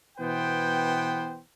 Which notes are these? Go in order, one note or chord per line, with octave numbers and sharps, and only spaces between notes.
B2 E3 B3 C5 G5